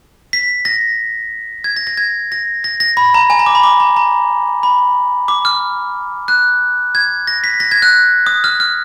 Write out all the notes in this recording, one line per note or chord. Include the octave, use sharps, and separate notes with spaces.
B6
A#6
G#6
A#6
A#6
G#6
A#6
A#6
A#6
B5
A#5
G#5
A#5
D6
B5
D6
A#5
A#5
B5
D6
F6
F#6
G#6
A#6
B6
A#6
G#6
F#6
D#6
F6
F6